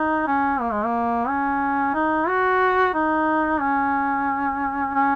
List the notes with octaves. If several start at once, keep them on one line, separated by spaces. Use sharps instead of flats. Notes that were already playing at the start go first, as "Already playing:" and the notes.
Already playing: D#4
C#4
A#3
G#3
A#3
C#4
D#4
F#4
D#4
C#4
C#4